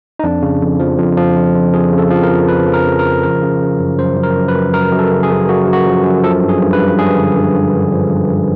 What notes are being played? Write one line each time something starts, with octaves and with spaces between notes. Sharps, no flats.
D#4
F2 D4
C#3
F2
F3
F2
F3
F2
F2
F2 G#4
C#3
A4
F3
A#4
F2
C#3 B4
F3
A#4
C#3
A#4
F3
C#3 A#4
C#3
C#3
F#2
F#2 C5
F#2
A#4
F#2
B4
F#2
F#2 A#4
F#2
A4
C#3
G#4
F#2
F#2 F#4
F#2
F#4
F3
F#2
F3 A4
G2
G#4
G2
B4
G2
G2 G#4
D3
G2
G2
D3
F3
G2
G2